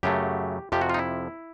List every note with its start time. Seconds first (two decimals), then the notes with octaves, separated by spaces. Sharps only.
0.03 F#2 C#3 F#3 A3 G4
0.72 F2 C3 F3 G4
0.81 F#4
0.90 F4
0.94 D#4
0.99 E4